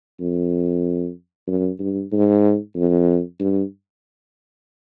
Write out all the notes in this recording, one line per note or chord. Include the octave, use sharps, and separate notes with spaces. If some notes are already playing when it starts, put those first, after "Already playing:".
F2
F#2
G2
G#2
F2
G2